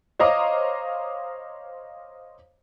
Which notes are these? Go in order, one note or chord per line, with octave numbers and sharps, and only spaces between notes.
C5 C#5 D#5 F5 A#5 D6